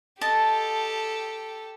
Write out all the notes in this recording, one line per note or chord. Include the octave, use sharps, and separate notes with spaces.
G4 A4 D#5 A5